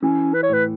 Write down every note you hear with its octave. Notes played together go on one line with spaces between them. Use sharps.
E3 C#4
B4
C#5
A2 B4